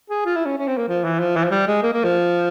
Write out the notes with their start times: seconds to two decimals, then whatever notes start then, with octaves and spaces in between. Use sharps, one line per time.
0.10 G#4
0.26 F4
0.36 E4
0.46 C#4
0.57 C#4
0.68 C4
0.78 A#3
0.89 F3
1.04 E3
1.19 F3
1.36 E3
1.44 F3
1.51 G3
1.67 G#3
1.83 A#3
1.93 A#3
2.04 F3